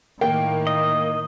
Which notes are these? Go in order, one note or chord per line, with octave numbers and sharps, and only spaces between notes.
A2 D#3 A#3 G5
D#5